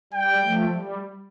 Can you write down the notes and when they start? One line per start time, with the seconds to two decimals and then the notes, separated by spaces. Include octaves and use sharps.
0.13 G3 G5
0.44 F3 A3
0.74 G3